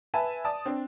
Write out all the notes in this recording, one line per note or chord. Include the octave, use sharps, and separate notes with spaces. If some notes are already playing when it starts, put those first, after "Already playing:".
B4 E5 G#5 A5
D5 A5 D#6
C4 D4